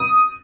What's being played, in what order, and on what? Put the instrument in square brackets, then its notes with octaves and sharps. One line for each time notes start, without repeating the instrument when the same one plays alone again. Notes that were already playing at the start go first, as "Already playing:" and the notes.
Already playing: [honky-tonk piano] D#6